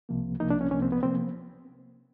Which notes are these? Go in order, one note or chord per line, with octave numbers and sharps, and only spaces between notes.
C2 C3 F3 A#3
C2 C3 F3 A#3 D#4
D4
C#4
C2 C3 F3 A#3 C#4
C4
B3
C3 F3 A#3 C4